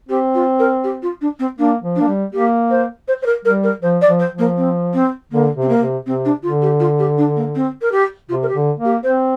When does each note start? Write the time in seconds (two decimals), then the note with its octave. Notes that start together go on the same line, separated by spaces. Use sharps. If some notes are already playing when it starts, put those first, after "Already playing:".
0.09 C4 G4
0.34 F4
0.59 A#4
0.84 G4
1.02 F4
1.21 D4
1.39 C4
1.59 A#3 D4
1.83 F3
1.96 A#3 D4
2.08 G3
2.33 A#3 G4
2.70 C5
3.08 C5
3.22 C5
3.26 A#4
3.45 G3 A#4
3.63 A#4
3.82 F3 C5
4.01 D5
4.07 F3
4.19 C5
4.32 F3
4.39 A#3
4.57 C4
4.94 C4
5.31 D3 A#3
5.56 C3
5.62 C4
5.69 A#3
5.80 C3
6.05 C3 C4
6.25 D4
6.43 D3 F4
6.62 G4
6.80 F4
6.99 G4
7.18 D4
7.36 A#3
7.55 C4
7.81 A#4
7.92 G4
8.29 C3 F4
8.43 A#4
8.48 G4
8.54 D3
8.80 A#3
8.85 G4
9.03 C4 C5